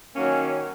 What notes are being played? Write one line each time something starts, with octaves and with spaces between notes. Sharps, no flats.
D#3 F#3 A#3 C#4